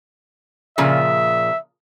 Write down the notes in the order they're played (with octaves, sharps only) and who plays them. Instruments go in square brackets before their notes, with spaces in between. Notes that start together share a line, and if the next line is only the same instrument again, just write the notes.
[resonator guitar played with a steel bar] A#2 C#3 F3 [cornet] E5